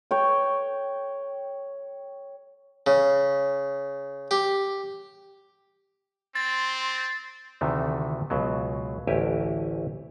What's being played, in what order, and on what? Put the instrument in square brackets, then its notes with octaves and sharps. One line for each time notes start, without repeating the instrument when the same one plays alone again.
[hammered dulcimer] C#5 G5
[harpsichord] C#3
G4
[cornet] C4 [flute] C6 [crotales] A6
[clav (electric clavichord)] D2 C3 D#3 E3 A3
C#2 B2 F#3
A1 D2 E4 G4 G#5